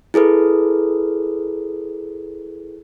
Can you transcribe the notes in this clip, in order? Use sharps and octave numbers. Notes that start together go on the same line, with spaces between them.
E4 G#4 A4 B4